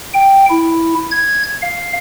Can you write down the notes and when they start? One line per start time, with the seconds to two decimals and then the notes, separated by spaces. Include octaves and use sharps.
0.14 G5
0.50 E4
1.11 G#6
1.62 F5